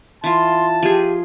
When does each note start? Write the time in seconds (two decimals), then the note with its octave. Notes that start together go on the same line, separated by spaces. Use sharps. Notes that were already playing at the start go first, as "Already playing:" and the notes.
0.24 E3 F4 A5 C6
0.83 F3 G4 G#4